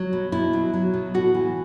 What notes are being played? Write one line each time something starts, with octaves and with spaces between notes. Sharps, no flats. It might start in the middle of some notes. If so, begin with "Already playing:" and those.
Already playing: F#3
B2
B2 E4
F#3
F#3
B2
A2 F#4
E3